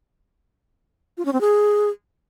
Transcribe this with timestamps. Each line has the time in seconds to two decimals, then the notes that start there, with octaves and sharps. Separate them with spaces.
1.18 F4
1.25 C#4
1.33 C4
1.41 G#4